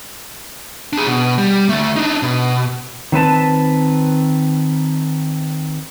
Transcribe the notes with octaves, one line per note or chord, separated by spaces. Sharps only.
D4 G#4
B2
G3
D2 A3
D4 D#4
B2
D#3 C4 B4 A5